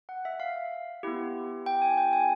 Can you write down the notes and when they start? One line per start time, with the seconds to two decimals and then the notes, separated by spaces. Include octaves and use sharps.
0.09 F#5
0.25 E5
0.40 F5
1.03 B3 E4 G4
1.66 G5
1.82 G#5
1.98 G5
2.13 G#5